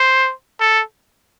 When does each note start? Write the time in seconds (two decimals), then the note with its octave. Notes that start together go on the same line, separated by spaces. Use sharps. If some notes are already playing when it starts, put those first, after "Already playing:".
Already playing: C5
0.60 A4